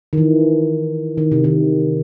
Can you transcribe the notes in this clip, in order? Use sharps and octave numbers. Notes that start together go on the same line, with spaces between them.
D#3
E3
D#3
C3
D#3